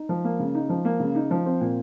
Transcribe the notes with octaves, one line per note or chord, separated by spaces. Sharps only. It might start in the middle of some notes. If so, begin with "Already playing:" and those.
Already playing: D#4
F3
A#3
C#3
D#4
F3
A#3
C#3
D#4
F3
C4
A#2